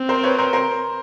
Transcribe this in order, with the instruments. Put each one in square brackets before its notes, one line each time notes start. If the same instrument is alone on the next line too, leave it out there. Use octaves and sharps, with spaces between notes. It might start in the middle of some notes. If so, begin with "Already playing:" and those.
Already playing: [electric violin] C4
[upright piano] A#4 C5
B4 C#5
A#4 C5
A#4 C5